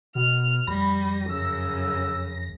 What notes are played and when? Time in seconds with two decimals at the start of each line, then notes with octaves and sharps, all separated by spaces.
0.15 B2 F6
0.67 F2 G3 B5 A#6
1.29 F#2 C#3 E6